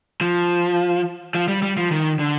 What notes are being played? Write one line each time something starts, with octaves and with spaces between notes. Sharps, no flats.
F3
F3
G3
G3
F3
D#3
D3